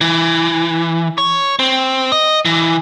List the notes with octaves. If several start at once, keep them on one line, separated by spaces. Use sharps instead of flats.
E3
C#5
C4
D#5
E3